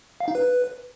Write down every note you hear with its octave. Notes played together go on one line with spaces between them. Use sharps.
F5
D#4
B4